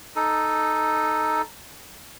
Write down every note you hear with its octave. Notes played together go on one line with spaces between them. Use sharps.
D#4 A4